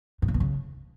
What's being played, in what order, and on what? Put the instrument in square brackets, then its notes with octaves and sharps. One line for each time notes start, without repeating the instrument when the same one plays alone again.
[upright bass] A2
C#3
B2
C#3